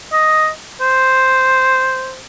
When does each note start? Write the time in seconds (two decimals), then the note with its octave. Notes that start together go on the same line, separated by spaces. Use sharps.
0.13 D#5
0.81 C5